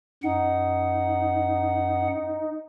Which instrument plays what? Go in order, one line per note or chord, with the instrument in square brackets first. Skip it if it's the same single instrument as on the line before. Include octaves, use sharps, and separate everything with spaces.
[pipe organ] F#2 F#5 [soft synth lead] D#4